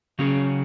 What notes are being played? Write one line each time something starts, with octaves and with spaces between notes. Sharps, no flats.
C#3 F#3 C#4 G#4